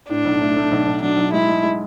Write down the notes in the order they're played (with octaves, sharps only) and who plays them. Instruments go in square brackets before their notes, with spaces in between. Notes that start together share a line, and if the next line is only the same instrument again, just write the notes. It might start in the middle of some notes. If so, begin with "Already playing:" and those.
[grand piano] A2 [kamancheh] D4
[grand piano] B1
A3
A3
B1
B1
[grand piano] F#3 [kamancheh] D4
[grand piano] B1
[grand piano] G#3 [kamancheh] E4
[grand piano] G#3
G#3